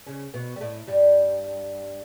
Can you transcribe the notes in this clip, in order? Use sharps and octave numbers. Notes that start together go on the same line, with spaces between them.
C#3 C#4
B2 B3
G3
A2 A3
G2 G3